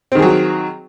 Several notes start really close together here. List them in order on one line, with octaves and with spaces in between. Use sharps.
C4 D#3 G#4 F#3